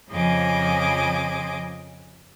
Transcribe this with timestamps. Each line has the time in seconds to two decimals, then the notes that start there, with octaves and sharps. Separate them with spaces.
0.10 F2 C#3 F3 D#5 G#5 D6